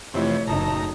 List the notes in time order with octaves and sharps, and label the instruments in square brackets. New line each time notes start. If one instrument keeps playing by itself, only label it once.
[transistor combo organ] F2 C3 E3 [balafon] A3 E4 G4 [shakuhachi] C#5
[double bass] F#1 D#4 [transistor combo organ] A2 A#5 [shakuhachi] A5